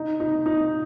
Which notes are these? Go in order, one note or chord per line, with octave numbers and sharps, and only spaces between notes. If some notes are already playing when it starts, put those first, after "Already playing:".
Already playing: D#4
D#4
D#4